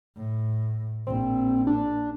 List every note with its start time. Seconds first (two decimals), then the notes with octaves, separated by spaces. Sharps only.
0.17 A2
1.07 A#1 C4
1.67 D4